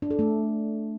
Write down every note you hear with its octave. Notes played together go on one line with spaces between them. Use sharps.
D4
A4
A3